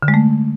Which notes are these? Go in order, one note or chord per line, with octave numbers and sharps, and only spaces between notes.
D3
G#3
A3